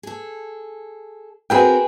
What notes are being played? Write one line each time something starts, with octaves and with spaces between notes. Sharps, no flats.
G#4 A4
C4 F#4 G#4 A#4 B4 G5